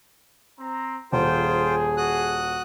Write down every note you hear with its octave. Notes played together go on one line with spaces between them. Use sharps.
C4 A#5
D#1 F4 G#4 C5 G5
F#4 D#6 F#6